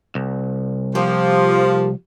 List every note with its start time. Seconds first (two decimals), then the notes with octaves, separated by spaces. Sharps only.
0.15 C2
0.95 F3 A3 A#3 G4